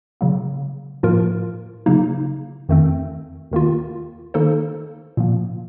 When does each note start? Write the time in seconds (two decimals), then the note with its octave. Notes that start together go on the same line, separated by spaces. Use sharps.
0.21 C#3 F#3 A#3
1.03 A2 F3 A#3 F4 A#4
1.86 C#3 F#3 A#3 D#4
2.69 F2 D#3 A3 C4
3.51 D#2 D#3 A#3 F4
4.34 D#3 A#3 D#4 A4 C5
5.17 A#2 F3 A#3